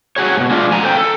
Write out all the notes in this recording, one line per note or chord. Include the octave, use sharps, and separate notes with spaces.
F#4 G#4 C#5
G#2 B2
G#3 A3 D4 F4
F3 G#5 A#5
A4 C5 G5
A4